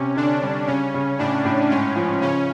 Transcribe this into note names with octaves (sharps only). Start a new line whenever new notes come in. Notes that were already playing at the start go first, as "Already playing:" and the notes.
Already playing: C3 C#4
D3 D4
G3
C#3 C#4
C#3
A2 D4
A2
G#2 C#4
F3
C#3 C#4